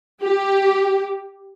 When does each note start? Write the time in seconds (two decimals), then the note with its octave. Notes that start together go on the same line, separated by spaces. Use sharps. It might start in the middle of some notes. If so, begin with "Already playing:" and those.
0.22 G4